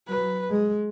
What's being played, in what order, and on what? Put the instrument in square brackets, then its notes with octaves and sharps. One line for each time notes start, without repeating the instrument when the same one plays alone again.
[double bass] F#3 [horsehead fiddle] B4
[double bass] G#3